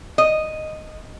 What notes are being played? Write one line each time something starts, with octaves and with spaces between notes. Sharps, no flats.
D#5